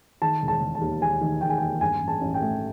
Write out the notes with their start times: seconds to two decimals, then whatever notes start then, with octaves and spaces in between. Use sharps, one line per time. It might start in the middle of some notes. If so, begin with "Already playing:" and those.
0.22 D#3 A5
0.42 E1
0.48 A5
0.61 E1
0.75 A5
0.81 D#2
1.01 D#2 G#5
1.21 D#3
1.41 D#3 G5
1.49 G#5
1.58 D#2 G5
1.81 G2 G#5
2.01 A1
2.08 A5
2.21 A1
2.34 G5
2.41 A3